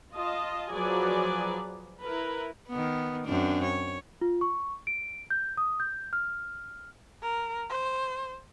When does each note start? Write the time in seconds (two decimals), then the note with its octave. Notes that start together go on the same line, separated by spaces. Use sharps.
0.14 F4 D#5 A5
0.72 F3 F#3 G#4 B4 D5 G#5
2.03 E4 A#4 B4
2.69 D#3 B3
3.25 F#2 C4 D4
3.63 C#5
4.22 F4
4.41 C#6
4.87 D7
5.30 G6
5.57 D#6
5.80 G6
6.13 F6
7.22 A#4
7.70 C5